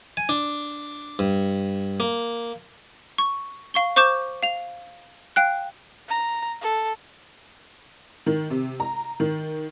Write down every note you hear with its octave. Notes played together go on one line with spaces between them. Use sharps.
G#5
D4
G2
A#3
C#6
F5 C#6 G7
C5 C#6 D6 G6 E7
F5 F7
F5 G5 F#6
A#5
A4
D#3
C3
A#5
D#3